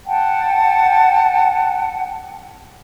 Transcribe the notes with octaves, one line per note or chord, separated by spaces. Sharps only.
F#5 G5 A5